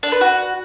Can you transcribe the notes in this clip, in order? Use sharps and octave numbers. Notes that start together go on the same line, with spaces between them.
D4
B4
F#4